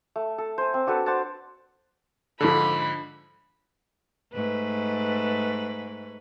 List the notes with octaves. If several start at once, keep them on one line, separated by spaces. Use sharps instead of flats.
A3
A4
C5 G#5
C4
D4 F#4 A4 B4
C5 D5 F#5 A5
G#2 D3 F3 A4 B5
G#2 A3 B4